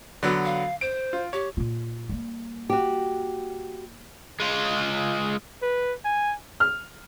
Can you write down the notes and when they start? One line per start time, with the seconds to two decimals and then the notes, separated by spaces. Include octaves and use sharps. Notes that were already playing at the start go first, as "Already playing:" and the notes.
0.23 D3 F#3 B3
0.45 F5
0.81 C5 D7
1.13 F4
1.33 G4 C#5
1.57 A#2 F4
2.09 G3 A#3
2.70 F#4 G4
4.40 G#3 F4
5.62 B4
6.05 G#5
6.60 F6